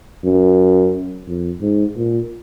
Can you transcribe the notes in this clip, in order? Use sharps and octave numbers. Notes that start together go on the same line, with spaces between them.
F#2
F2
G#2
A#2